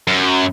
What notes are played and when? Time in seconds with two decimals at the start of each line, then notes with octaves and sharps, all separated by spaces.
0.08 F#2